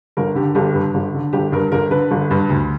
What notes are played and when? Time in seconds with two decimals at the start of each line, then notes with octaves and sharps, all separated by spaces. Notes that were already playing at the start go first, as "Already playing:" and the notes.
0.17 G1 A#4
0.35 D3 G4
0.55 G1 G4
0.75 G2
0.94 G1
1.14 D3
1.33 G1 G4
1.52 G2 A#4
1.72 G1 A#4
1.91 D3 B4
2.11 G1
2.31 G2
2.49 D2